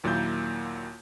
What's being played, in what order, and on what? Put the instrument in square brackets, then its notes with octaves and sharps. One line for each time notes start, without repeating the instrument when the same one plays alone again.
[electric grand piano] D#2 A#2 F#3 A#3 E4 G6